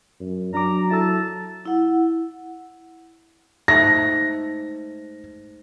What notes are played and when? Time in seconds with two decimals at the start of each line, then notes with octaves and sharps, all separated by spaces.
0.20 F#2
0.54 F#3 D4 A#5 D6
0.91 E4 A4 A5 E6
1.66 E4 F#5
3.68 G#2 A3 F#5 A#6